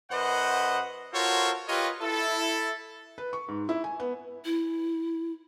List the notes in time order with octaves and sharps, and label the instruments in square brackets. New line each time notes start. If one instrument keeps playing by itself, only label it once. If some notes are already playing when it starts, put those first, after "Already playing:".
[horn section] F#2 B4 C5 D#5 F#5
F4 F#4 A4 A#4 C5 C#5
F4 G4 A#4 B4 C#5 D#5
E4 A4
[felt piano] B4
C#6
G#2
E4
G#5
B3
[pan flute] E4